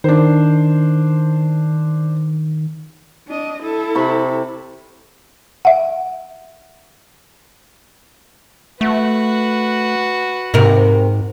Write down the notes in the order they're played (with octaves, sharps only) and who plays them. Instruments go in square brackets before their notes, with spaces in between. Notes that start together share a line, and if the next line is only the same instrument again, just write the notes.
[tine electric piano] D#3 [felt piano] D4 C5
[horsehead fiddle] D4 D#5
E4 A4
[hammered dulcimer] C3 B5 C#6
[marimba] E5 F#5
[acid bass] A3 [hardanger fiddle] F#4 B4
[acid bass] G#2 [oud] C3 A#4